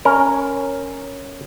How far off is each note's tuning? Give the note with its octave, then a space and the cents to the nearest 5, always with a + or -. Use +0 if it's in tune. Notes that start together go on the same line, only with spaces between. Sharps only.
C#4 +0 A#4 +0